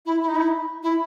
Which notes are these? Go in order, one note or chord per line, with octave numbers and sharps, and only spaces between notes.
E4
E4
D#4
E4
E4